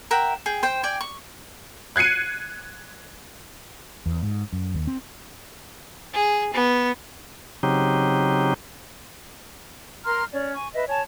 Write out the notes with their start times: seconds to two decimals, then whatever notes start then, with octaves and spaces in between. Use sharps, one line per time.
0.11 A#4 E5 F#5 G5
0.46 G#4 G5
0.63 C5 G5
0.83 D5 G5 G#5
1.01 C#6
1.96 F#6 G#6 C7 C#7 D#7
4.06 E2
4.23 G#2
4.53 F#2
4.74 D#2
4.87 C4
6.13 G#4
6.53 B3
7.63 C#3 F#3 C4 D#4 G4
10.04 A#4 A#5 C6 F6
10.32 C#4 C#5 D5
10.54 G#5 C#6
10.74 B4 D#5 E5
10.88 C#5 G#5 A5